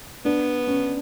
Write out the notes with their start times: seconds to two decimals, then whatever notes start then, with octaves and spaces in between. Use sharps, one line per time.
0.25 B3 D4
0.67 C#4